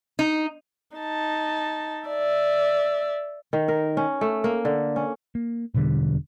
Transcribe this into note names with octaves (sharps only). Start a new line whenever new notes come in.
D#4
D#4 A5
D5 E5
D#3
A#4
C#4
A3
A#3
D3
C#4
A#3
E1 B2 D3 G3